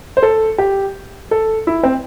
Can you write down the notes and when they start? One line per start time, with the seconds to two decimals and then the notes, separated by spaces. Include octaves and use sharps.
0.17 C5
0.23 A4
0.58 G4
1.31 A4
1.67 E4
1.83 C4